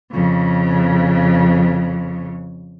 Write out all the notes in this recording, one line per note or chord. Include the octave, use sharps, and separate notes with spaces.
F2 C#3